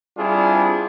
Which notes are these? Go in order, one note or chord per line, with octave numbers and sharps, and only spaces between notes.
G3 C4 D4 E4 F4 G#4